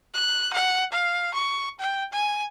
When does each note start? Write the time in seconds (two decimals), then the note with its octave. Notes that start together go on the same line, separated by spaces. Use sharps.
0.14 F#6
0.54 F#5
0.92 F5
1.35 C#6
1.80 G5
2.13 G#5